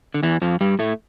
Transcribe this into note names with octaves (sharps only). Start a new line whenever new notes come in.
D3
E2 E3
F2 F3
G2 G3
A2 A3